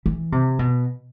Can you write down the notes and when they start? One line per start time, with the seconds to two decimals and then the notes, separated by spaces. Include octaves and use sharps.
0.06 E3
0.32 C3
0.59 B2